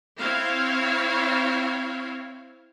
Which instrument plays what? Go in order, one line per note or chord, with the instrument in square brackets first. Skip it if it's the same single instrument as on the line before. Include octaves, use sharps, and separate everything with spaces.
[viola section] C4 E4 C#5 F5